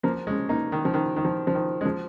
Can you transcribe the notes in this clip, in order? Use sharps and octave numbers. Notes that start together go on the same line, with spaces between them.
F3 A#3
G#3 C#4
A#3 D#4
D#3
F3
D#3
D#3
F3
F3
D#3
G#3
F3